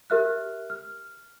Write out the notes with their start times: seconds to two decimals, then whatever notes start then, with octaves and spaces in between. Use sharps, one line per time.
0.10 G4 A#4 E5 F6 F#6
0.70 F6